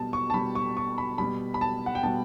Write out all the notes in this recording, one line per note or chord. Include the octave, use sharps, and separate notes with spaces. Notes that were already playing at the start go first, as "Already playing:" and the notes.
Already playing: B2 G3 A5
C#6
A5
B2 G3 B5
C#6
C#6
B5
B2 G3 B5
B5
A5
F#5
G5
B2 G3 A5